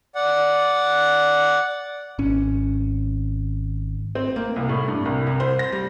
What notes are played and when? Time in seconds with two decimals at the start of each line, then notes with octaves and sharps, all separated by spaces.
0.15 D5 F#5
2.19 G#1 C#4
4.15 C4
4.36 A#3
4.56 C2
4.69 A2
4.88 G2
5.05 C2
5.27 C2
5.40 C5
5.59 A#6
5.72 G3